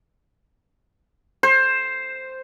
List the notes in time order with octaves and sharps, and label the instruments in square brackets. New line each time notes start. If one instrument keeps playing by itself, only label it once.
[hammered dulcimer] C5